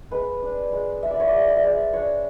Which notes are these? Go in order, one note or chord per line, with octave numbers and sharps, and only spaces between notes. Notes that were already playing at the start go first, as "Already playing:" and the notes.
G#3 B4
D4
G#3
G#3 E5
D5
C#5
D5
G#3
D5
E5
G#3 D5
D4 C#5